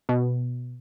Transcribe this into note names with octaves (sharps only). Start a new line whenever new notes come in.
B2